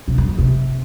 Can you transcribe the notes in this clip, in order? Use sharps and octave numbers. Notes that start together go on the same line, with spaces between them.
C3
F2
F#2
C3